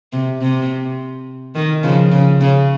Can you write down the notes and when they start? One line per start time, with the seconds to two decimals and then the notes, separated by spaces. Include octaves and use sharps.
0.13 C3
0.41 C3
1.55 D#3
1.83 C#3 F3
2.12 C#3
2.41 C#3